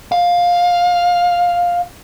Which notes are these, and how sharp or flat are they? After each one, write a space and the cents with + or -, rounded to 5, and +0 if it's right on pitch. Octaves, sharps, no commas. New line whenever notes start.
F5 +10